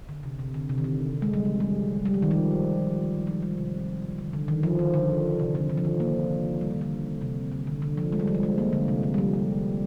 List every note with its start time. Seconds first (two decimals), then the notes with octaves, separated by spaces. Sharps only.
0.09 D3
0.23 C3
0.39 C3
0.54 D3
0.69 C3
0.78 D#3
0.84 D3
1.22 G#3
1.33 G3
1.45 F3
1.60 G3
2.05 G3
2.14 F3
2.23 D#3
2.31 F3
3.27 F3
3.43 G3
3.58 C3
4.18 D3
4.33 D3
4.48 D#3
4.63 F3
4.79 D#3
4.94 D3
5.40 C3
5.55 D3
5.70 D3
5.77 F3
5.85 D#3
6.00 A#3
6.61 G3
6.71 F3
6.81 D3
7.22 C3
7.52 D3
7.67 D3
7.82 D3
7.98 F3
8.12 G#3
8.20 G3
8.28 F3
8.35 G3
8.43 G#3
8.58 A#3
8.73 D3
8.88 C3
9.03 D3
9.14 G3
9.18 F3
9.34 F3